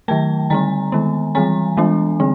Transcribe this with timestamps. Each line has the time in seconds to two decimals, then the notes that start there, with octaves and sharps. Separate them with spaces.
0.08 D#3 F#3 A3 G5 A5
0.50 D3 G3 C4 G#5 A#5
0.92 D#3 G#3 B3
1.35 E3 G3 C4 G#5 A#5
1.77 E3 G#3 B3 D4
2.20 D3 G3 C4